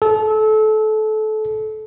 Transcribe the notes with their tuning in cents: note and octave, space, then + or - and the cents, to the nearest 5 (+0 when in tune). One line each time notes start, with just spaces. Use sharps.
A4 -25